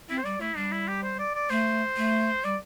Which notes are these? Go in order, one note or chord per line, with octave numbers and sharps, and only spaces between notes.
C4 E4
C5
G3 D5
A3 E4
G3 D4
E4
G4
C5
D5
D5
A3 C5
A3
G3 D5